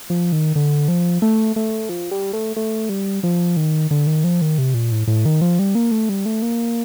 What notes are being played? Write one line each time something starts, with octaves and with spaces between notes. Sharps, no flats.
F3
D#3
D3
F3
A3
A3
F3
G3
A3
A3
G3
F3
D#3
D3
D#3
F3
D#3
C3
A#2
A2
A2
D#3
F3
G3
A#3
A3
G3
A3
A#3